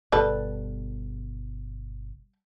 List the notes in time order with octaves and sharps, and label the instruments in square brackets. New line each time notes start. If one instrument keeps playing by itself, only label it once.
[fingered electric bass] G1 B2 B3 [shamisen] G3 A4 B4